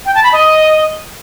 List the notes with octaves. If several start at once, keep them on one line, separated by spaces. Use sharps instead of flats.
G5
A5
B5
D#5